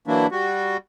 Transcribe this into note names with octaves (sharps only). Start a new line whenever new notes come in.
E3 F#3 A#3 D4 E4
G3 F#4